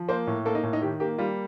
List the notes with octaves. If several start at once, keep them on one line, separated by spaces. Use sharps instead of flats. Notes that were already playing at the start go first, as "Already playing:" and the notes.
Already playing: F3
A#3 C5
A2
A#3 A4
D#4
A2
D#4
D#3 G4
A#3 G4
G3 F4